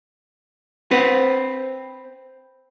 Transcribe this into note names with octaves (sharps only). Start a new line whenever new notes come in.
C4 B4